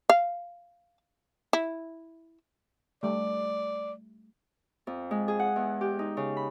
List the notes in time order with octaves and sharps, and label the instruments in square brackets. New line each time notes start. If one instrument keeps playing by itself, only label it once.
[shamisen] F5
E4
[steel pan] G3 A3 [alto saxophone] D5
[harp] F2
G#3
G#4
F#5
E2
G4
D#4
C#3
B5